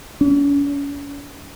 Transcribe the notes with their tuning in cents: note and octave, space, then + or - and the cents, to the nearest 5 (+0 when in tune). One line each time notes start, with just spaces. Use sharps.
C#4 +40